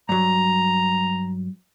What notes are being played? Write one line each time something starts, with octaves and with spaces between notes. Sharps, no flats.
G2 F#3 A#5